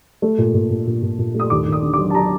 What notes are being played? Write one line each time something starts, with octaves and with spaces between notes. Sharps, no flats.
A3
A#2
A#2
A#2
A#2
A#2
A#2
A3
D#6
D#2 D6
D#2
D#6
D3
F#3 D6
A5
F#3 A#5